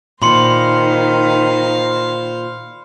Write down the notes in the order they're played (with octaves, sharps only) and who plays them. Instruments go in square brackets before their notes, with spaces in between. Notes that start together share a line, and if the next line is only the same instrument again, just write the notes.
[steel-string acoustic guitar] A#2 [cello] D#3 [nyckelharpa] C5 F5 [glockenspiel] B5 C6 C#7